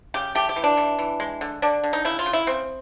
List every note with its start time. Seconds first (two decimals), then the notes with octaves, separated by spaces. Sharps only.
0.14 C#3 G4
0.35 A3 G4
0.49 G4
0.56 E3
0.64 D4
0.77 E3
0.99 E3
1.20 G#3
1.41 D3
1.62 D3 D4
1.84 D3
1.93 D#4
2.05 C#3 E4
2.19 F4
2.26 C#3
2.33 E4
2.47 C#3 C4